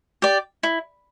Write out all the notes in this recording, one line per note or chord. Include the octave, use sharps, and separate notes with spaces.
G4 D5
E4